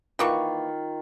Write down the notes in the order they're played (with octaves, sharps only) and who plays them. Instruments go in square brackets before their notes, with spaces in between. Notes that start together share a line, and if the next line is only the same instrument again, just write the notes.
[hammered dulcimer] D#3 F4 [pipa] E3 A#3 C#6